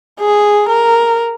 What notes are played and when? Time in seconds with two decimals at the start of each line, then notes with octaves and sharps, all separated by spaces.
0.21 G#4
0.69 A#4